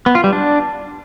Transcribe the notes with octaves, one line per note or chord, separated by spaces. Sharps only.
B3
F4
G3
D4